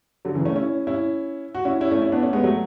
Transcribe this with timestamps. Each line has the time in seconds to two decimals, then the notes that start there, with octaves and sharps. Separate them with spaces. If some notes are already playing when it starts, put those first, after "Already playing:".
0.25 D3 F#3
0.35 C#3 E3
0.45 A3 C#4
0.55 C#4 E4
0.87 C#4 E4
1.55 F#4
1.65 C#4 E4
1.81 C#4 E4
1.91 A3 C#4
2.02 C#4 E4
2.12 B3 D4
2.22 A3 C#4
2.33 G#3 B3
2.44 F#3 A3